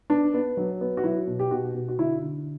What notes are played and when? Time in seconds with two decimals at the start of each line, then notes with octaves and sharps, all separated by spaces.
0.10 B3 D4
0.34 B3
0.57 F#3
0.81 B3
0.97 F#4
1.04 F#3 E4
1.27 B2
1.39 G4
1.51 B2 F#4
1.75 B2
1.88 F#4
1.98 D3 E4
2.22 D3